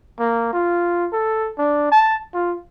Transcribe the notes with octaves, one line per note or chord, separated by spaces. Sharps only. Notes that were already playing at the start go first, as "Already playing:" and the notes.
A#3
F4
A4
D4
A5
F4